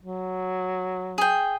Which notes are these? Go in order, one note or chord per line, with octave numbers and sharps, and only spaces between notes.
F#3
G#4 G5